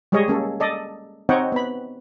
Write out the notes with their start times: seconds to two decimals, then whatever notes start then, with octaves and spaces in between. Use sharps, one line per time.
0.12 G3 G#3 G#4 C#5 D#5
0.28 A#3 C#4 A4
0.60 A4 D5 D#5
1.29 C4 D#4 C#5 D#5 F#5 G5
1.52 B3 B5